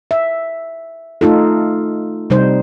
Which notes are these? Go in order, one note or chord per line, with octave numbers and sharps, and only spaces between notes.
E5
A3 D#4 F4 A4
C3 G3 D#4 C5